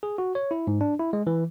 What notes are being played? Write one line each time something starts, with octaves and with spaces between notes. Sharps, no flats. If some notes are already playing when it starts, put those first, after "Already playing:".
G#4
F#4
C#5
E4
G#2
D4
E4
G#3
E3